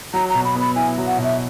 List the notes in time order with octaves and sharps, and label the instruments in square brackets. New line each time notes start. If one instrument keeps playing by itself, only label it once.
[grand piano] F#3 [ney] A#5
[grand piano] B2 [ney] A#5
[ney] B5
[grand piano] B3 [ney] B5
[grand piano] E4 [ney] G#5
[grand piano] F#3
[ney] F#5
[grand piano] B2
[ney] E5